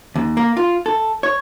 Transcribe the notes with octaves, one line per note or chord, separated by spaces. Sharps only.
D#2
A#3
F4
A4
C#5